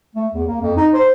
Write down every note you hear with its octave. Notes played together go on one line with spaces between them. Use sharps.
A3
E2
A#3
F2
D#4
C5